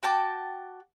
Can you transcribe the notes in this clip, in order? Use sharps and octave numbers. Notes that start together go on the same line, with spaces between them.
F#4 G5 A5 D6